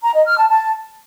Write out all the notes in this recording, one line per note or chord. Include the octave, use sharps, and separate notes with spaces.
A#5
D#5
F6
A5
A5